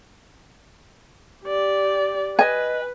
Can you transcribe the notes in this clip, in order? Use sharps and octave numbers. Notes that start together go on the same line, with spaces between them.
G4 D5
B4 D#5 G#5